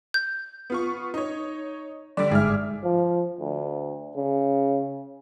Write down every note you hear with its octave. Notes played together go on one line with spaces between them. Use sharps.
G6
B3 F4 C#6
D#4 C#5
D3 G3 D5 D6
G1 G#2 G#4 E5 D6 F6
F3
D2
C#3